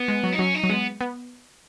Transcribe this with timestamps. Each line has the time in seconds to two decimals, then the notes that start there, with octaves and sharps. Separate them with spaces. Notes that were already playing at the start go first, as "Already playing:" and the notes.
Already playing: B3
0.08 G#3
0.24 F#3
0.32 D#4
0.39 F#3 C#4
0.54 D#4
0.64 F#3
0.70 G#3 B3
1.01 B3